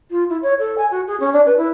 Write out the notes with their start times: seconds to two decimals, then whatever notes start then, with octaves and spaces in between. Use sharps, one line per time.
0.11 F4
0.30 E4
0.42 C#5
0.59 A4
0.78 G#5
0.91 F#4
1.07 G#4
1.20 C#4
1.33 D4
1.46 B4
1.58 E4